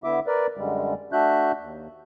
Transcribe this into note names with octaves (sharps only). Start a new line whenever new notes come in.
D3 B3 E4 E5 D6
A#4 B4 D5
F#2 D3 G3 G#3
A3 D4 F#4 E5 F#6 G6
D#2